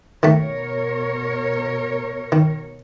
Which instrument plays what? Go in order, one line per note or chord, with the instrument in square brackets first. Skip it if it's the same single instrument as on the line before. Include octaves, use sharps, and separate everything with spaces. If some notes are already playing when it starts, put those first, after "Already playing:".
[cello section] B2 A#4 C#5 [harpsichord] D#3 A3
[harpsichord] D#3